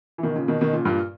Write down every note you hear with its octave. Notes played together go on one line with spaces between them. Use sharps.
E3
B2 D#3
A#2 C#3
B2 D#3
B2 D#3
A#2 C#3
G2 A#2